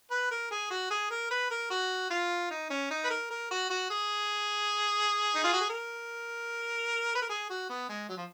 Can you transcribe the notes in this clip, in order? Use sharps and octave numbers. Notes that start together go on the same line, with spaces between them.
B4
A#4
G#4
F#4
G#4
A#4
B4
A#4
F#4
F4
D#4
C#4
D#4
B4
A#4
A#4
F#4
F#4
G#4
D#4
F4
F#4
G#4
A#4
B4
A#4
G#4
F#4
B3
G#3
F#3
F3